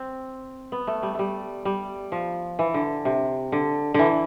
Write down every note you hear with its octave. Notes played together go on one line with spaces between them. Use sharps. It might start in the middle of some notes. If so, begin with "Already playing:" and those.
Already playing: C4
B3
A3
G3
G3 A3
G3
F3
E3
D3
C3
D3
D3 E3